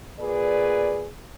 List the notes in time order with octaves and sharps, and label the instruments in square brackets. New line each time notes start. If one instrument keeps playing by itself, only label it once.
[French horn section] A#2 G#4 B4 D5